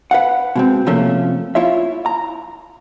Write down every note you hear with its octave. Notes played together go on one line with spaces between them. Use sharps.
B4 F5 F#5
B2 G#3 C4
C3 F3 A3 A#3 C#4
E4 F4 C#5 E5
A#5